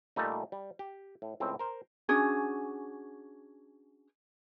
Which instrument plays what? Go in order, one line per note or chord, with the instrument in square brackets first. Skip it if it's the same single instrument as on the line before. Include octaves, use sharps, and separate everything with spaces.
[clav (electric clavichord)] A#2 G3 A3 D#4
G3
G4
A2
C#2 A2 C4
A#4 C5
[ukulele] C#4 D4 F#4 G#4